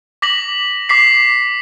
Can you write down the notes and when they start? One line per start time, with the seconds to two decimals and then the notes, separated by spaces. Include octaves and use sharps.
0.22 D6 A#6 B6 F#7
0.89 D6 B6 C7